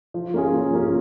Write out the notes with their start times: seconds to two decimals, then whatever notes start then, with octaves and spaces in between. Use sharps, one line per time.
0.14 F3
0.34 A#3 C#4 F4 G#4
0.54 F3
0.74 A#3 C#4 F4 G#4